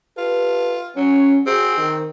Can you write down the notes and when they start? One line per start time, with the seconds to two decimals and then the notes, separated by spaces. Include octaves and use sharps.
0.17 F4 G4 A4 B4
0.96 F#3 C#4
1.46 C4 F#4 G#4
1.78 D#3